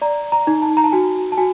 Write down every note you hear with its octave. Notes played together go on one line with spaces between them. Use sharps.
D5 A#5
A#5
D#4
A5
A#5
A5
F#4 G#5
A5
F#4 G#5